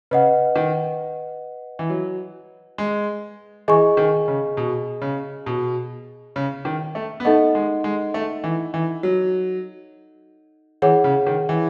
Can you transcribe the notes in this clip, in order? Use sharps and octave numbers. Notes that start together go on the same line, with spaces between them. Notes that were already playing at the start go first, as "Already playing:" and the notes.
C#3 B4 D#5 F#5
D#3
E3
F#3
G#3
E3 G#4 D#5 G#5 C#6
D#3
C#3
B2
C#3
B2
C#3
D#3
A3
B3
A3 D#4 A4 D#5 F#5
G#3
G#3
A3
E3
E3
F#3
E3 G#4 C#5 F#5
C#3
D#3
E3